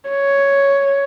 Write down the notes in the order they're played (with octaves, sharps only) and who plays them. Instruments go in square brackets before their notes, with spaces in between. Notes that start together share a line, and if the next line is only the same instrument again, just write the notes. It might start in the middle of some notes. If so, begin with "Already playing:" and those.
[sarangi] C#5